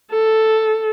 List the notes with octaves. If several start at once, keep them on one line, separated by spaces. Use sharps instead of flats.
A4